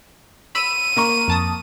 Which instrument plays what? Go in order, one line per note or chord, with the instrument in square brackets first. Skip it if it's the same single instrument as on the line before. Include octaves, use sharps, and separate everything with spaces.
[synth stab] B5 E6 [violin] D#7
[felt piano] A#3 A#5 C#6
[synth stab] F2 A5 D#6